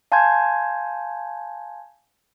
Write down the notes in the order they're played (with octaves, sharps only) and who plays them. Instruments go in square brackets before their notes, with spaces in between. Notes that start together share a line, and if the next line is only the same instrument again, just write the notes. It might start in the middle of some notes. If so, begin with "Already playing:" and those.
[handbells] F5 G#5 A5 C6 G6 G#6